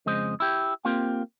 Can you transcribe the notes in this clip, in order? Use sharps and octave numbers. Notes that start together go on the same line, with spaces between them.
F2 C#3 G#3 C5 D#5
E4 G4
A#3 C4 F4 G4